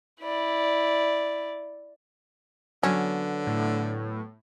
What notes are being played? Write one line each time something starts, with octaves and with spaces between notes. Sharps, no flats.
E4 D5
D3 F#3 B3 C#4
A2